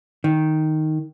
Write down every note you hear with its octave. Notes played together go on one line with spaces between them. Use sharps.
D#3